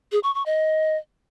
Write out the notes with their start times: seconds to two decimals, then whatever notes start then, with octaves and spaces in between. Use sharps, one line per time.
0.12 G#4
0.23 C#6
0.35 C#6
0.46 D#5